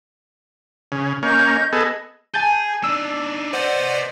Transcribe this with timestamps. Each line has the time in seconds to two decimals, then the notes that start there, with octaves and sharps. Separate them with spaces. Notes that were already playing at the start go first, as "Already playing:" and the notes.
0.92 C#3
1.23 A#3 C#4 D#5 G6
1.73 B3 G#4 A4 D#5
2.34 G#4 G#5 A5 G6
2.84 D4 D#4 E6
3.53 B4 C5 D5 D#5 F#5